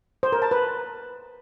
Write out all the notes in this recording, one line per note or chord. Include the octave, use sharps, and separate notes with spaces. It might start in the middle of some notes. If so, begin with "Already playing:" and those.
C5
A#4
A5
B4